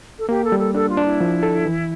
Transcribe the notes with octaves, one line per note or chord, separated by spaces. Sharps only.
A4
A#3 G4
A4
G3
A4
D4 A4
F4
D4
E4
F3
A4
E3